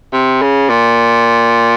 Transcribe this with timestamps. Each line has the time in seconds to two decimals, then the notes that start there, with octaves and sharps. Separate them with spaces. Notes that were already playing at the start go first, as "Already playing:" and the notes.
0.13 C3
0.42 C#3
0.69 A#2